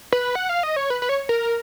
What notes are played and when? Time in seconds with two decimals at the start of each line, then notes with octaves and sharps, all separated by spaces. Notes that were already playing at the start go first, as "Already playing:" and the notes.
0.13 B4
0.35 F#5
0.49 F5
0.63 D#5
0.76 C#5
0.90 B4
1.02 B4
1.09 C#5
1.29 A#4